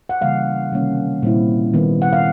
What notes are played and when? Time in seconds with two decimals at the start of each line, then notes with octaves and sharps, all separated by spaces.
0.09 F#5
0.21 C#3 E3 G3 A#3 F5
0.72 C3 D#3 G3 A#3 C#4
1.23 A#2 G3 C4 E4
1.74 D#3 G3 B3
2.02 F#5
2.13 F5